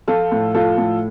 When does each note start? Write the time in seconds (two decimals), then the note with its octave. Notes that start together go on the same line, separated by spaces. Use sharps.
0.08 F3 F4 A4
0.31 A2
0.54 F3 F4 A4
0.78 A2